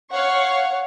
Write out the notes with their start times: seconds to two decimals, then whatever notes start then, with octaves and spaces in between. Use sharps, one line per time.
0.10 C#5 F5 F#5 C#6